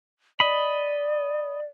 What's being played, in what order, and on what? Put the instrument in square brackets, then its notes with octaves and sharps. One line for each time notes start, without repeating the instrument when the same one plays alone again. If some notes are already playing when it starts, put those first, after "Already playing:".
[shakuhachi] D5 [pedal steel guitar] D#5 B5